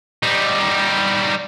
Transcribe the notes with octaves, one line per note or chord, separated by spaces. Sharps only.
G3 D#4